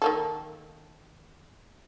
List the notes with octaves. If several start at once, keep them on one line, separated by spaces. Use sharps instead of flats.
D#3 A#3 A4